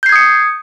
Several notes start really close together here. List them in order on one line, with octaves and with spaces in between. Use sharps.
G6 C7 G#6 D#6 C#7